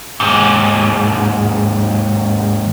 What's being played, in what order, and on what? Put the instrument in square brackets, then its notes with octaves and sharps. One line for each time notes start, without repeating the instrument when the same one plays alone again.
[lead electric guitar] D#2 G#2